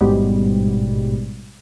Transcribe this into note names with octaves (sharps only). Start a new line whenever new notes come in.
A1 G#2 B2 G3